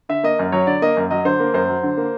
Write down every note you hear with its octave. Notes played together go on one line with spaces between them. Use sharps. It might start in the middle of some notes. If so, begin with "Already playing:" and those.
D3 E5
A#3 D#5
F#2
F#3 C#5
D3 D5
A#3 D#5
F#2
F#3 D#5
D3 C5
A#3
F#2 C5
F#3
D3
A#3